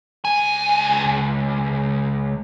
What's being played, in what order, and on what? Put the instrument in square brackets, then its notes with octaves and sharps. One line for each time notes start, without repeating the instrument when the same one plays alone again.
[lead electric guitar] C#2 G#5